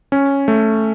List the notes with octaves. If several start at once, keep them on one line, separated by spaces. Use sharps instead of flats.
C#4
A3